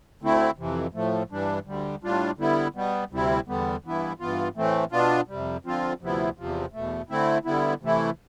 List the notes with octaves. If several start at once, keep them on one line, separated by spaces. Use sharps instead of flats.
D2 D3 A3 C4 E4
F2 C3 E3
A2 F3 A3
G2 E3 G3 D4
D2 D3 G3
A2 G3 D4 F4
D3 G3 B3 E4
B2 G3 B3
D2 C3 G3 C4 E4
E2 D3 G3 B3
G2 E3 B3 E4
G2 E3 B3 F4
A2 E3 A3 C4
B2 B3 D4 F4
F2 C3 G3
D3 F3 C4 F4
D2 C3 F3 B3 E4
E2 C3 F3
E2 B2 A3
D3 A3 C4 E4
D3 G3 B3 E4
C3 E3 A3 E4